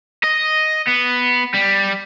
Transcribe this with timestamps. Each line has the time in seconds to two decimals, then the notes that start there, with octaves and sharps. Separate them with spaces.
0.24 D#5
0.87 B3
1.54 G3